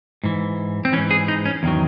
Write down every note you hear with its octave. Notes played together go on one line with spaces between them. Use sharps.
G#2 E3
C4
G#2 E3 C#4
G#4
D#4
C#4
E2 D#3 F#3